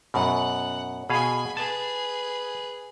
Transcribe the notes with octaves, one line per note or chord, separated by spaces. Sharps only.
F#2 B2 F#5
B2 G#4 F5 G#5 B5
G#4 B4 A5